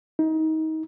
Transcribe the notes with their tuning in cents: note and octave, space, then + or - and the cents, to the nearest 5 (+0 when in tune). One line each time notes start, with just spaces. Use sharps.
D#4 +25